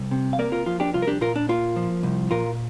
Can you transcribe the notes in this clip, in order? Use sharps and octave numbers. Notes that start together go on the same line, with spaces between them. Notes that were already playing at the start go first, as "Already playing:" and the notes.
Already playing: C2
C3
F5
A#3 A#4 D5
F4 A#4
F3 F4
D4 G4
C2 F4
A#4
D4 G4
A#2 F4 A#4
D4
A#3 F4
F3
C2
A#2 F4 A#4